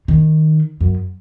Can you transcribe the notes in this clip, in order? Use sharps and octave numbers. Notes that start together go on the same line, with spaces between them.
D#3
F#2